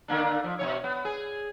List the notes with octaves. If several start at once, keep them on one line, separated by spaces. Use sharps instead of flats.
D3 A#3 D4
F3
B2 E3 C#5
B3
G#4